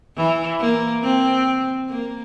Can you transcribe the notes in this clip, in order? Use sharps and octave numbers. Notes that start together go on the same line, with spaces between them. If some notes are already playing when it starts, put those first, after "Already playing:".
E3
A#3
C4
A#3